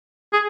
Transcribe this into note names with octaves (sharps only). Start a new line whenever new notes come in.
G#4